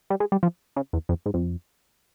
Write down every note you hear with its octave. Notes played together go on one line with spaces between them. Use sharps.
G3
G#3
G3
F3
C#3
E2
F2
G#2
F2